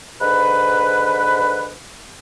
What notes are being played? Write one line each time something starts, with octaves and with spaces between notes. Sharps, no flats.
G#2 D3 B4